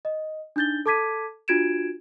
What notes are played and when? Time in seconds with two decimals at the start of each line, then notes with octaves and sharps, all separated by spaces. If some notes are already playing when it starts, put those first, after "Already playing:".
0.05 D#5
0.56 D4 D#4 G6 A6 G7
0.86 A4 A5 D6 G#6 B6 D#7
1.48 D4 F4 F#4 G#6 D7 E7